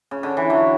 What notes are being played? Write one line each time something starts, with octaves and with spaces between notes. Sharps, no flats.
C#3
D3
E3
D3 F#3